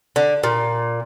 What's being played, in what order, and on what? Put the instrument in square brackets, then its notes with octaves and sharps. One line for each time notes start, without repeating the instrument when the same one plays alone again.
[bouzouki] D3
A#2